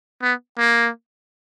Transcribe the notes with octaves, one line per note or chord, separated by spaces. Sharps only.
B3
A#3